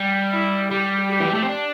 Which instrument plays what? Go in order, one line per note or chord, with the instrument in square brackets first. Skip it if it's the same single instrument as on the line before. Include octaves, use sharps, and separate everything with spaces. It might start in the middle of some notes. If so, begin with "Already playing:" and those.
Already playing: [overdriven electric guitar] G3
[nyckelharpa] E4
[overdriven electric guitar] G3 [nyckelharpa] G4
[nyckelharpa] G4
[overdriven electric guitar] E3
G3
A3
C4
D4